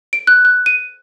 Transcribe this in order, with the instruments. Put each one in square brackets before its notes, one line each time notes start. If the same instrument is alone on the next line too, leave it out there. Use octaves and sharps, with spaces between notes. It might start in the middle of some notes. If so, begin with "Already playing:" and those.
[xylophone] D7
F#6
F#6
D#7